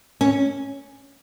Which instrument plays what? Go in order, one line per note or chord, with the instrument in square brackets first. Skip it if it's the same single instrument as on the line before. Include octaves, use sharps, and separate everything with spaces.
[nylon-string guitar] C#4